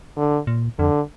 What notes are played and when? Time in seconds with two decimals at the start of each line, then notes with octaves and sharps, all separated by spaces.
0.17 D3
0.47 A#2
0.79 F2 D3